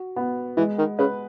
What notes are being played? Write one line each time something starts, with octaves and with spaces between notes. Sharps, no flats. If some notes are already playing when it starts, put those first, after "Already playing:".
Already playing: F#4
B3
E3 G#3
D#3
C#3 B4